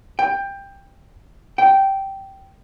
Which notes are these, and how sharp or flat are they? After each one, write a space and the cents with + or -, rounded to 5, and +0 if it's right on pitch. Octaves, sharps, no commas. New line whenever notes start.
G5 +15
G5 -10